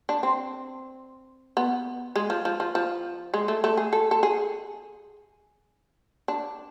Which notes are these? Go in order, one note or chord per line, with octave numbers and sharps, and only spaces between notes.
D4
C4
B3
G#3
F3
F3
F3
F3
G#3
A3
A3
G#4
A4
A4
G#4
D4